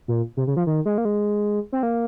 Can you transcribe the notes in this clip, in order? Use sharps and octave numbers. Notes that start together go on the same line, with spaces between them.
A#2
C3
C#3
F3
D#3
G#3
A#3
G#3
C4
A#3